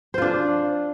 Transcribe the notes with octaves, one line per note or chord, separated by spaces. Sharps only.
D4 F4 C5